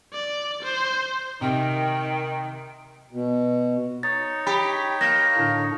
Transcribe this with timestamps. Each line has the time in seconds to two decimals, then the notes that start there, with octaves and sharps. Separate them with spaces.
0.13 D5
0.63 C5
1.41 C3 D#3 G5
3.12 B2
4.03 D#4 C#5 A6
4.47 G4 B5
5.01 A#3 A#6
5.37 A2 D3 D4